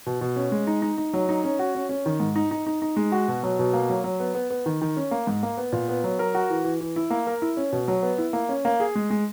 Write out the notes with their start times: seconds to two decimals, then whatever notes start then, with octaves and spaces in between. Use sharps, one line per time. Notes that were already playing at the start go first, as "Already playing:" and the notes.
0.06 B2
0.21 B2
0.36 C#4
0.52 G#3
0.67 D#4
0.82 D#4
0.98 D#4
1.14 F#3
1.29 D#4
1.44 C#4
1.59 F#4
1.75 C#4
1.89 C#4
2.06 D#3
2.20 G#2
2.36 D#4
2.51 D#4
2.66 D#4
2.82 D#4
2.96 G#3
3.12 F#4
3.28 B2
3.43 F#3
3.59 B2
3.73 A#3
3.90 F#3
4.04 F#3
4.20 B3
4.34 B3
4.50 B3
4.66 D#3
4.81 D#3
4.97 C#4
5.11 A#3
5.27 G#2
5.43 A#3
5.57 B3
5.72 A#2
5.89 B3
6.04 F#3
6.19 A#4
6.35 F#4
6.50 E3
6.64 E3
6.81 E3
6.96 E4
7.10 A#3
7.27 A#4
7.42 E4
7.57 C#4
7.72 B2
7.88 F#3
8.03 B3
8.18 E4
8.33 A#3
8.49 C#4
8.65 A#3
8.80 G#4
8.95 G#3
9.10 G#3